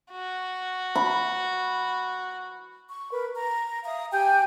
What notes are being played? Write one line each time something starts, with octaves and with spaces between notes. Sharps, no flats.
F#4
B5
C#6
A#4 B4
A#5
E5 F5 A#5 D#6
G4 G5 G#5 G6